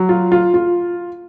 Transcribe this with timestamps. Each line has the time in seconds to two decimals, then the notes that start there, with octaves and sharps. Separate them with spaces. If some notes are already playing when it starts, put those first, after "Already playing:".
Already playing: F#3
0.09 F4
0.32 F4
0.54 F4